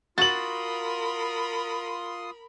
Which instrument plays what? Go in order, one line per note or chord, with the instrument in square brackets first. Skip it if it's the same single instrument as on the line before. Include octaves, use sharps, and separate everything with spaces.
[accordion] F4 C6 D#6 [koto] F#4 [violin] A#4 B5 [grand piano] A6 F#7